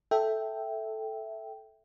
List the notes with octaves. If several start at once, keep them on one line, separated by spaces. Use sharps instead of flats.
A4 E5 G5